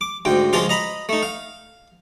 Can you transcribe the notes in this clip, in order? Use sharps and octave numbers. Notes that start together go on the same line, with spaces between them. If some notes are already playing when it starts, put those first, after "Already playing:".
D6
D2 G#2 G5
C#2 F3 G#3 F4 F5 C6
D#5 A#5 B5
A3 D#4
F5